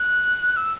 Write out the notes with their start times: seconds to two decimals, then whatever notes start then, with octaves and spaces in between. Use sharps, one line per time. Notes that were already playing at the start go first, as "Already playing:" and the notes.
Already playing: F#6
0.57 E6